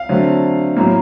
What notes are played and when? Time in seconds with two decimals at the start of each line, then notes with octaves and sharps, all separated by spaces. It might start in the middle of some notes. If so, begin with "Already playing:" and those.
Already playing: F5
0.09 D3 F#3 A3 C4
0.77 A2 F#3 A#3